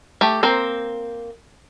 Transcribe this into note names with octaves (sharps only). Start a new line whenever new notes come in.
A3 G4
A#3 C4 A#4 C5